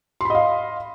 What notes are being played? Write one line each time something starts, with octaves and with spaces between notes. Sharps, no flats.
D#5 F5 B5 C6